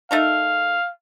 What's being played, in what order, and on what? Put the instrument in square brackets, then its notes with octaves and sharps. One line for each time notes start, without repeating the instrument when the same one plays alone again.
[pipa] A3 D#4 A#4 [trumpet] F5